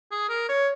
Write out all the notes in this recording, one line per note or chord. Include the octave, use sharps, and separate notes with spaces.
G#4
A#4
C#5